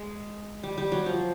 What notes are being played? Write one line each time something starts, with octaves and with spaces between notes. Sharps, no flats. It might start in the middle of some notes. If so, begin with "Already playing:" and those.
Already playing: G#3
G3
G3
F#3
F3